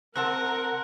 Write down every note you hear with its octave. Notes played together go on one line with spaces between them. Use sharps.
C3 C4 A#4 F#5 A5 F#6